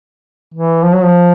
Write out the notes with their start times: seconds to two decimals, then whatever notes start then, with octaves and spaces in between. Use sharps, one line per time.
0.54 E3
0.84 F3
0.94 F#3
1.04 F3